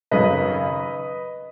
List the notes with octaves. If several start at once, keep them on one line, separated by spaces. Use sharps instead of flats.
G#1 F#2 C#3 B4 D#5